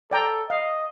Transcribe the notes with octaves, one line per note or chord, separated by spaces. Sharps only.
A4 D5 G5 A#5
D#5 F5